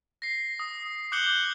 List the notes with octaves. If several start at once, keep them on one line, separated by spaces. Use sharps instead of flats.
A#6 C7
D#6
D6 F#6 G6 C#7 F#7 G7